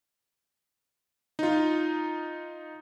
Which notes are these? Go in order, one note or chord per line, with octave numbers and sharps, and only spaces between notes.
D#4 F4